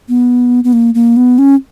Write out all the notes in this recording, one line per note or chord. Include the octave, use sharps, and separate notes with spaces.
B3
B3
A#3
A#3
B3
C#4